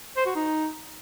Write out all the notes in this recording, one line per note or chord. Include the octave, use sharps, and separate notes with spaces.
C5
F#4
D#4